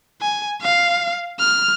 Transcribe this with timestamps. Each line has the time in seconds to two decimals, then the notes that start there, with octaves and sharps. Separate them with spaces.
0.21 G#5
0.62 F5
1.39 F6